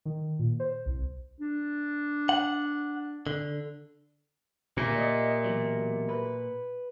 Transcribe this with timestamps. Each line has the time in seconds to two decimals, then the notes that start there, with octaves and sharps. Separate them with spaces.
0.05 D#3
0.39 A#2
0.60 C5
0.86 C2
1.41 D4
2.29 F#5
3.27 D3
4.77 D2 A#2 G4 A#4 E5
4.96 D5 D#5
5.44 E2 B2 F#3
6.09 B4